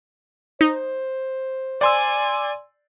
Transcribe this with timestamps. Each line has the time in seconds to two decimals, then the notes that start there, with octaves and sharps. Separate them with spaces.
0.61 D#4 C5
1.81 D5 G#5 C6 E6